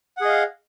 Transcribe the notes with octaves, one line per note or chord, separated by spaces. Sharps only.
G#4 D#5 F5 F#5